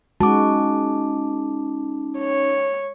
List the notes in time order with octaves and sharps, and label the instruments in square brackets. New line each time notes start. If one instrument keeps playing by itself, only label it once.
[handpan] G#3 F#4 [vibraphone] C#4 D#4 [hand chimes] A5 D6
[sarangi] C#5